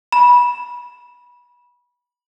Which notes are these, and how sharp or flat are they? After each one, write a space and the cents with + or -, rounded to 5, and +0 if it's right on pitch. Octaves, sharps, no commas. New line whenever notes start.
B5 -20